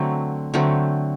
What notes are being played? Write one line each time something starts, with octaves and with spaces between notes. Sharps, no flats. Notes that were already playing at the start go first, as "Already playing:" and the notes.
Already playing: D3 F#3 A3 C4
D3 F#3 A3 C4